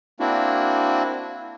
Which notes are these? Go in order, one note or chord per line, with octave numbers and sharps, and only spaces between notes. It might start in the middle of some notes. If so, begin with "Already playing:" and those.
A#3 C4 D4 E4 F#4